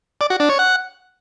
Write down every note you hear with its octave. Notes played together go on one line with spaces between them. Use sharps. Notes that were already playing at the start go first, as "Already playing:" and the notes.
D5
F#4
D4
C#5
F#5